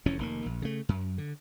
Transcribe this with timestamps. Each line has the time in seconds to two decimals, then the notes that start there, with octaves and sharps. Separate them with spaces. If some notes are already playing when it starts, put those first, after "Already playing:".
0.06 F1 F2 E3 C#4
0.19 F1 D#3 A#3
0.46 A#1
0.62 C#3 A3
0.89 F#2
1.18 D3